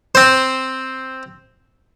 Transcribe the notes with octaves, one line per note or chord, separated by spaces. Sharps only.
C4 C5